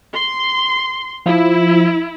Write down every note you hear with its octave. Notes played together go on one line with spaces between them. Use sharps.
C6
F3 E4